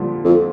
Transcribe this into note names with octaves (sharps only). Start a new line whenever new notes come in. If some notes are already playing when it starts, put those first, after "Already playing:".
Already playing: A#2 D3 F3 G3
F2